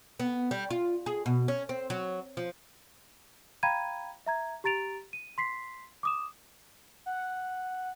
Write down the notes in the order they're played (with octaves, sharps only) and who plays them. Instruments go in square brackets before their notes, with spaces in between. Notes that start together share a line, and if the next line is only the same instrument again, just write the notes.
[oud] B3
G3
F4
G#4
B2
C#4
C4
F#3
F3
[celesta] F5 G5 A#5 B5 G#6 D#7
E5 A#5 G#6
G4 A#5 A6 D7 F7
D#7
C6 B6 C7
D6 D#6 E7
[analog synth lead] F#5